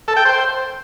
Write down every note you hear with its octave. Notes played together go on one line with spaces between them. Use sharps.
A4
G5
C5